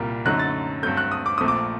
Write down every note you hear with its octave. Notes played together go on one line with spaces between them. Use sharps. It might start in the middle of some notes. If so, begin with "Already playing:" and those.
Already playing: C2 A#2 G3 A#3
F#2 D3 F#3 A3 D#4 F#6
A6
G2 F#3 A3 G6
F#6
D#6
D6
A#1 A#2 A3 C4 D#6
D6